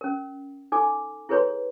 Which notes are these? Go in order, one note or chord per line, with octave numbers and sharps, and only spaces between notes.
C#4 A#4
D#4 A4 G#5 D6
E4 G#4 A4 B4 C#5 C6